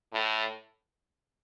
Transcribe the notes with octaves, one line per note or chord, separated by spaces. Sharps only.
A2